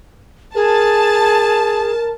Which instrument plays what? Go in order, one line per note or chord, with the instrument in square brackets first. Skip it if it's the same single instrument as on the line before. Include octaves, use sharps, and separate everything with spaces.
[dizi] G#4 [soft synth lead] A#4 [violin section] A5